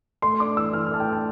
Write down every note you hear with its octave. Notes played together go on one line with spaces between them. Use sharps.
A3 C6
D4 D6
E3 E6
E3 F6
F6
A3 A5
G5
D4
A5